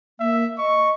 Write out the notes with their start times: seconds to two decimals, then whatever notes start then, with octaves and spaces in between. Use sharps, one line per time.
0.20 A#3 E5
0.58 D#5 C#6